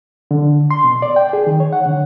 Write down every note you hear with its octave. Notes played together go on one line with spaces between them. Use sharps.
D3
C6
B2
D5
G5
G#4
D#3
C#5
F#5
D3